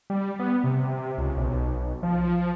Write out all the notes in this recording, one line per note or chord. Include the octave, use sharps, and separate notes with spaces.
G3
B3
C3
C#2
B1
F3